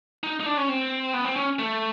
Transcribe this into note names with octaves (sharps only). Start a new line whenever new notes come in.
D#4
D#4
D4
C#4
C4
B3
C4
C#4
A3